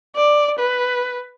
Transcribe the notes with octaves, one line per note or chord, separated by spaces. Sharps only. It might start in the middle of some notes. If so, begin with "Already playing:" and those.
D5
B4